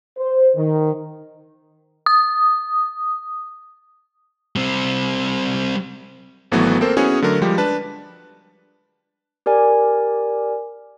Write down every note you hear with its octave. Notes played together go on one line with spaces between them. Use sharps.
C5
D#3
D#6
G3 C4
G#1 E3 F#3 A3 B3 F#4
A#3 C4 A4 A#4 C5
B3 C#4 E4 F#4 G#4 C#5
D3 F#3 A3 A#4
F3 G3 G#3 G4
D4 B4 A5
G4 A#4 D5 G#5